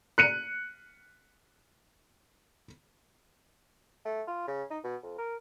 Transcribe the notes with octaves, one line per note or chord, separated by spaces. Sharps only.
F#6 C#7 D#7
A3
F4
C#3
D#4
B2
F2
A#4